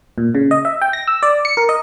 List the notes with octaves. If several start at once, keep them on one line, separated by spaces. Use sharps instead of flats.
A#2
C#3
D#5
E5
G5
A#6
E6
D5
C#7
A#4
D#5